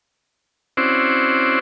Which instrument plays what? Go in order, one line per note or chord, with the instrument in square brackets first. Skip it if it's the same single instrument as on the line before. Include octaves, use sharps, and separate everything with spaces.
[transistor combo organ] C4 C#4 E4 F#4 C5 D5